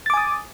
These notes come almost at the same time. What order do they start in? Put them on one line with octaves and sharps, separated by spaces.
A6 D6 G#5 D#6